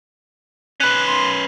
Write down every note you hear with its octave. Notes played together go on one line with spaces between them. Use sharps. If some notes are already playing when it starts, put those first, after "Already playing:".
C#4 B4 F#6
C6